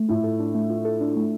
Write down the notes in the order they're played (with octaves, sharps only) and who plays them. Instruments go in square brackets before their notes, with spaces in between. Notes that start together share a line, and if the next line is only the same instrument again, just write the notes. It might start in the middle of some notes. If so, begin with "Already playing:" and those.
Already playing: [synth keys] A3
[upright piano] A2 [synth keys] F4
[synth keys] A4
D4
A3
F4
A4
D4
A3